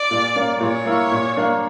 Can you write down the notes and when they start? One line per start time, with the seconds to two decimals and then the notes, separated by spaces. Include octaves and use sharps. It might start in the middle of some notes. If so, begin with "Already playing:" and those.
Already playing: D5
0.11 A#2
0.35 A#3 C#4
0.60 A#2 C#5
0.86 A#3 E4
1.12 A#2
1.37 A#3 D4